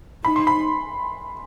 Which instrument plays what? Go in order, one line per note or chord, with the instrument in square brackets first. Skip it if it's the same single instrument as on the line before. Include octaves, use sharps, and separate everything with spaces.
[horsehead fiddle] D#4 [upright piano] B5
[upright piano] C6
B5